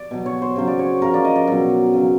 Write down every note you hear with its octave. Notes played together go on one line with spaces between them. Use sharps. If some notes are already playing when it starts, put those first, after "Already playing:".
Already playing: D5
B2 F#3
C#5
C5
C#3 F#3 C5
D5
C#5
C#3 F3 A#4
D5
D#5
D5
B2 F#3
C#3 F#3